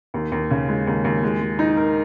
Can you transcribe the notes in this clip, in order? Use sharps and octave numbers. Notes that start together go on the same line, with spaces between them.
D#2
D#2
C#3
G#3
D#2
D#2
G#3
G#3
D#4
A#4